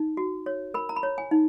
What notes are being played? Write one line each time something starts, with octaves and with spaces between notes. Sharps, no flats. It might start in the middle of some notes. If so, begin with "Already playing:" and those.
Already playing: D#4
F#4
C#5
A#4 B5
A#5
B5
C#5
G#5
D#4